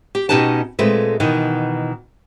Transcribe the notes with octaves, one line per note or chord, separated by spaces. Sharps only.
G4
B2 C#4 D#4 G4 B4 A5
A#2 G#3 A3 C4 A4 B4
B2 D#3 E3 B3 D#4